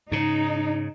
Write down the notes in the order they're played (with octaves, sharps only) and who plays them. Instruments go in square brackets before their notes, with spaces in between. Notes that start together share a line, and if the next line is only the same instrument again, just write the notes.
[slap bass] G#2 C#3 [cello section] D#4